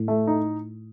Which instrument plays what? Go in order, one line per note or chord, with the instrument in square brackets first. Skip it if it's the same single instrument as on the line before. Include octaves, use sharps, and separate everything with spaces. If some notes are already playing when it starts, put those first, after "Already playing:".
Already playing: [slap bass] A2
[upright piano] A3
D#4